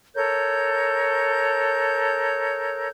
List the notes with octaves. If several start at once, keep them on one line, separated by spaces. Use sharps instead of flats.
A4 A#4 C#5 G6